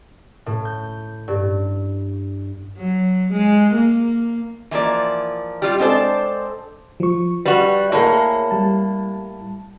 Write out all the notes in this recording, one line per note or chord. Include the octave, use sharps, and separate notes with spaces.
A2
G6
G2
F#3
G#3
A#3
E3 F3 A#3 D5
G3 F4
G#3 C4 D4 A4 C5 D5
F3 C#6
G3 F#4 B4
A2 A#3 G#4 C#5
G3 A5